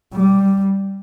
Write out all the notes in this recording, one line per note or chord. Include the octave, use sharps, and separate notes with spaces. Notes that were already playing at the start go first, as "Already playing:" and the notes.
G3